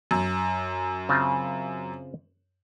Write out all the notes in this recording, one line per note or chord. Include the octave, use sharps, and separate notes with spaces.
F#2
C#3 C4 F4